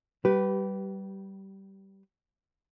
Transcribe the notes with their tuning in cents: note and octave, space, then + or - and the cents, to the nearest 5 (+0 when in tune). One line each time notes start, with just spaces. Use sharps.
G3 -15 G4 -30 B4 +0